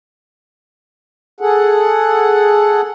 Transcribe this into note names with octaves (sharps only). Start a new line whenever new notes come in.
G#4 A4 F#5